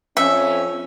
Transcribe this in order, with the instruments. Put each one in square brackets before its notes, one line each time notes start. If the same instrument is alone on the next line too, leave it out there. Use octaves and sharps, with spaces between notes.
[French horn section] F2 C#4 [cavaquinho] E5